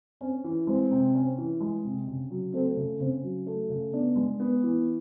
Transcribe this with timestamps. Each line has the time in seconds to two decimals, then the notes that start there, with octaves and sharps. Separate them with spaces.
0.21 C4 C#4
0.44 E3
0.67 G#3 C4
0.91 C3
1.15 C#4
1.38 E3
1.61 G#3
1.84 C3
2.08 C#3
2.31 F#3
2.53 A3 C4
2.77 C#3
3.00 C#3 C4
3.23 F#3
3.46 A3
3.70 C#3
3.93 B3 D4
4.16 G#3
4.40 B3
4.63 E3